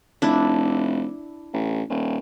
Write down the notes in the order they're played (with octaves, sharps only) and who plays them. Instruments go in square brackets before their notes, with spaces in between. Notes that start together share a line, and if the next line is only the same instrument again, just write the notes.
[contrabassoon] F1 [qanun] D4 E4
[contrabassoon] A1
D#1